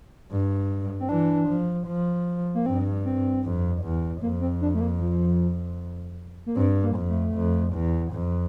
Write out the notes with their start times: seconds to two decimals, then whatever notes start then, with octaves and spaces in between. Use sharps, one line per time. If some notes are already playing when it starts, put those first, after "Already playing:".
0.31 G2
1.00 C4
1.09 E3 D4
1.48 F3
1.87 F3
2.54 A#3
2.66 G2 C4
3.05 C4
3.43 F2
3.83 E2
4.22 F2 A#3
4.41 C4
4.61 D4
4.74 A3
4.81 A#3
5.00 F3
6.46 A#3
6.56 G2 C4
6.83 A#3
6.95 F2
7.09 A3
7.35 F2
7.74 E2
8.13 F2